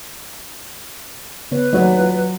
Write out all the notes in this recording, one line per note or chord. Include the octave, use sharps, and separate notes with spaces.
C#3 B3 B4 C#5
D#2 F#3 A3 D#4 D5
F4